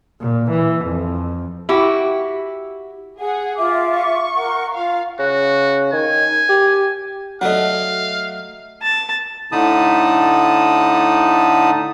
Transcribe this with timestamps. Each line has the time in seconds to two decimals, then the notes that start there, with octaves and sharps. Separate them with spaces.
0.21 A#2
0.50 E3
0.85 F2
1.69 E4 F#4 G4
3.20 G#4 F#5
3.57 F4 E5 D6
3.92 C#6
4.36 A#4 F#5
4.74 F4 F5
5.19 C#3 F#4
5.92 D#3 G#5
6.49 G4
7.41 F#3 A3 D#5 F5 F#5
8.82 A5
9.52 A2 D3 D#4 A5 B5 D#6